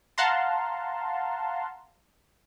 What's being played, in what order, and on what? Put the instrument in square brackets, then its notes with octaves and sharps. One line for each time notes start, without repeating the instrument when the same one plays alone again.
[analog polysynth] F5 F#5 A5 A#5 C6